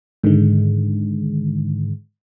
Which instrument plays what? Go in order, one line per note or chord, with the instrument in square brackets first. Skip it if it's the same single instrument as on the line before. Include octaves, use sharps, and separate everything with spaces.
[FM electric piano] G#2 D3 D#3 G#3